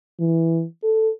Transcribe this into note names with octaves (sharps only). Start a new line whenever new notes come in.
E3
A4